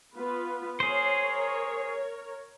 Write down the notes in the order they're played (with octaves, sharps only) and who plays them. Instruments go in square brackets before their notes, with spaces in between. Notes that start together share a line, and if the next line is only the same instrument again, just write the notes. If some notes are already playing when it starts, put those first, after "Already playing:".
[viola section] B3 F4 B4
[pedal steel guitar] G#4 C5 [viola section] A#4 C#5